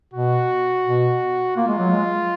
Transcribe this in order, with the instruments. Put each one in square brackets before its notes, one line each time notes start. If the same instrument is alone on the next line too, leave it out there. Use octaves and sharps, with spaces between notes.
[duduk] B2 [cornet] F#4
[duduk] B2
[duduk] A#3 [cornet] F4
[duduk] G#3
F#3
G#3